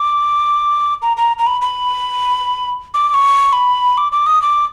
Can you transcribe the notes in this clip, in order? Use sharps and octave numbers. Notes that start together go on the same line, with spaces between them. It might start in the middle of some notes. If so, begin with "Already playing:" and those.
Already playing: D6
A#5
A#5
A#5
B5
B5
D6
D6
C#6
B5
D6
D6
D#6
D6